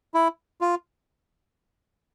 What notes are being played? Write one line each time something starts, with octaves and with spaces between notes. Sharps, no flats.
E4
F4